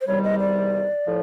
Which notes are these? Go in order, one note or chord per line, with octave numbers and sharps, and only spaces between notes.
C5
E2 C3 D#3 G3 C#5
D#5
D5
A2 F3